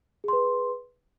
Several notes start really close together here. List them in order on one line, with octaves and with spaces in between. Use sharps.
G#4 C6 B4